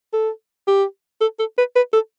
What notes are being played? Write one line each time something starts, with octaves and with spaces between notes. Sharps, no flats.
A4
G4
A4
A4
B4
B4
A4